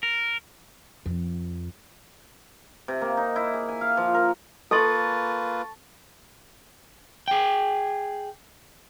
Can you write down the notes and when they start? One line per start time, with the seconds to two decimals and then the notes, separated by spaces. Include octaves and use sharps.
0.03 A#4
1.06 F2
2.88 C3
3.02 A#3
3.17 D#4
3.36 E4
3.54 G#4
3.69 G#5
3.81 F5
3.97 F3
4.14 A#4
4.71 A#3 F4 A4 B4 A5 C6 C#6 A6
7.28 G#4 G5